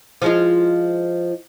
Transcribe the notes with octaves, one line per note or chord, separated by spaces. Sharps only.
F3 G#3 F4